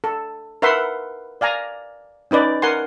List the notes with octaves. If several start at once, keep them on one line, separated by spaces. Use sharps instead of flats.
A4
A#4 B4 E5 F#5 B5 C6
D5 F5 G#5 A#5
C#4 D#4 B4 D5
A#4 F#5 G#5 C6